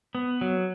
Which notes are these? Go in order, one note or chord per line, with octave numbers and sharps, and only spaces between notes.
B3
F#3